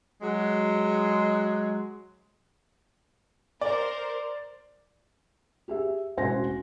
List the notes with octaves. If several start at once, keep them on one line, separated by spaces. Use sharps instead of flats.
F#3 G#3
A#4 C5 D5
G4 G#4 E5
E1 A1 F#4 C5 G#5 A#6